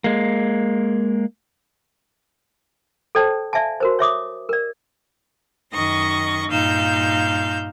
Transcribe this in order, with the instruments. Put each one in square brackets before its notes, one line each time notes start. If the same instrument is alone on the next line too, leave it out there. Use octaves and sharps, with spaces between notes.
[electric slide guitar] G#3 A#3
[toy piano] A4 C5 D5 G5 A5
D5 E5 F5 G#5 A5
F#4 A#4 C5
C#5 E5 D6 D#6
A#4 D5
[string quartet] F#2 D#3 D#5 C#6 A#6
G2 A#2 D#4 F5 E6 G6